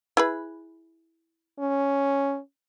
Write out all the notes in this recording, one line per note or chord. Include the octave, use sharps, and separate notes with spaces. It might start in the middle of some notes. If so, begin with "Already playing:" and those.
E4 G#4 B4
C#4